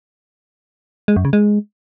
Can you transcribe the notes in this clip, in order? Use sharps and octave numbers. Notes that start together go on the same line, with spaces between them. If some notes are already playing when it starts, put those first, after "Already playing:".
G#3
F#2
C#3
G#3